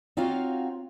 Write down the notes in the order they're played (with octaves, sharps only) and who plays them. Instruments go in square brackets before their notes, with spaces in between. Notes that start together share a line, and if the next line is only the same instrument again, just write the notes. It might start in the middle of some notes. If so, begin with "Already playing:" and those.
[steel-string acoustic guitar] C4 D#4 F4 F#4 C#5 F5